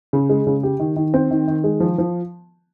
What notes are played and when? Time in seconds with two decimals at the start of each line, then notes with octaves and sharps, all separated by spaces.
0.13 C#3
0.29 G#3
0.47 C#3
0.63 G4
0.80 D#3
0.96 D#3
1.14 C4
1.31 D#3
1.48 D#3
1.64 G#3
1.80 F3
1.98 F3